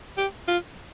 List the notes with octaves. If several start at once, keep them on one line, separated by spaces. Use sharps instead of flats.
G4
F4